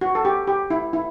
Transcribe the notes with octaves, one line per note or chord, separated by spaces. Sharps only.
F#4
A4
G4
G4
E4
E4